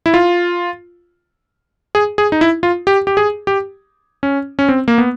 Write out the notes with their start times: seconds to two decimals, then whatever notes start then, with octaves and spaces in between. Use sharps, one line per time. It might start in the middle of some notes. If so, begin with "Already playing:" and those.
0.06 E4
0.14 F4
1.95 G#4
2.18 G#4
2.32 D#4
2.41 E4
2.63 F4
2.87 G4
3.07 G4
3.17 G#4
3.47 G4
4.23 C#4
4.59 C#4
4.69 C4
4.88 A#3
4.98 B3